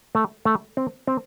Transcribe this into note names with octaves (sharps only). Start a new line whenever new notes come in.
A3
A3
C4
C4